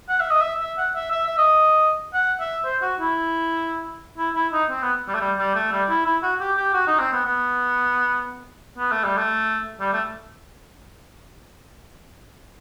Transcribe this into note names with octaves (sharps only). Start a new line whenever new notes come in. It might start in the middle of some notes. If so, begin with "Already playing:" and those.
F#5
E5
D#5
E5
E5
F#5
E5
E5
E5
D#5
F#5
E5
C5
F#4
E4
E4
E4
D#4
C4
B3
G3
A3
G3
G3
A3
G3
E4
E4
F#4
G4
G4
F#4
D#4
C4
B3
B3
B3
A3
G3
A3
G3
A3